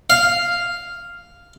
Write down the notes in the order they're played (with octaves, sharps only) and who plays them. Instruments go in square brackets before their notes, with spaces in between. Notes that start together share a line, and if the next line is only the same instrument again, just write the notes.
[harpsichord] F5